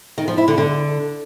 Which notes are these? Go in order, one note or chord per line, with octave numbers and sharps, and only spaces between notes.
D#3
F3
E4
D3
D3